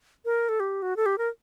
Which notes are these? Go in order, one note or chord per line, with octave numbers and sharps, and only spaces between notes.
A#4
A4
G4
F#4
A4
G4
A#4